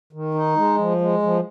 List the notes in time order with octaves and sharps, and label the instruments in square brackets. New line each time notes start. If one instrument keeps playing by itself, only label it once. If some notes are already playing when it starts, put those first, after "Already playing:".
[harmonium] D#3
D#4
G#3
F3
G#3
F3